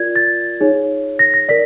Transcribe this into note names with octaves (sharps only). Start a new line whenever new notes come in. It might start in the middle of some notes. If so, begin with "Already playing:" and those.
Already playing: F4 A#4 D5 G#6
A6
D#4 G#4 C#5
A#6
A#6
A#4 D5 B6